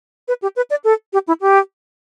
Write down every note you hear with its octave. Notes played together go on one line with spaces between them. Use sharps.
B4
G4
B4
D5
A4
G4
E4
G4